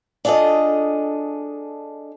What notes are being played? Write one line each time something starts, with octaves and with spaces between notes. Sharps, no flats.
D4 F4 G#4 A4 D#5